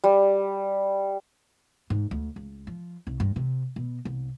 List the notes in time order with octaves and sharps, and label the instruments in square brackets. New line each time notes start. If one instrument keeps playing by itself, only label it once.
[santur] G3
[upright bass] G#2
D2
C#2
F3
C2
G2
C3
B2
C2